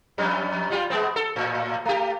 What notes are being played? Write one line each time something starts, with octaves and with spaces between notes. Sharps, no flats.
F2 G3
G3 F4 G4
G#3 B3 C4
A4
A2
A3 G4